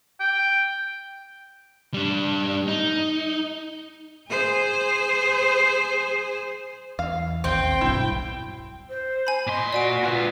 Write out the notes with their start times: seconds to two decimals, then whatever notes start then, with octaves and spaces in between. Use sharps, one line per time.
0.20 G5
1.94 G3 D4
2.67 D#4
4.28 G#4 C5
6.99 E2 F5
7.44 A1 D#2 C4 G5
7.81 D1 B1 G2 E4
8.89 C5
9.27 G#5 B5
9.47 A#2 D#5 C6
9.73 F#4 D5 G#5 D7
10.04 F4 B4